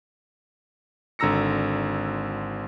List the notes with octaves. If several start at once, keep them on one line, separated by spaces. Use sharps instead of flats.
G#1 D3 A#5 E6 A#6 C#7